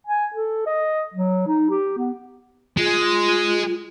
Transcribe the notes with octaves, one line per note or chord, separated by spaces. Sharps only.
G#5
A4
D#5
F#3
D#4
G4
B3
G#3 F4